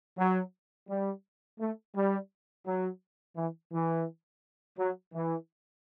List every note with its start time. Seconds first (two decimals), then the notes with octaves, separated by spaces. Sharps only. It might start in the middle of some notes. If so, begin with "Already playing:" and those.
0.18 F#3
0.89 G3
1.60 A3
1.95 G3
2.66 F#3
3.36 E3
3.72 E3
4.79 F#3
5.14 E3